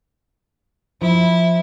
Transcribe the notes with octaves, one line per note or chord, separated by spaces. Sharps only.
F3 E4